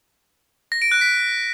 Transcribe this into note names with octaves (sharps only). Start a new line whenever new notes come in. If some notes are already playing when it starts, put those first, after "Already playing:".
A#6
D7
F#6
B6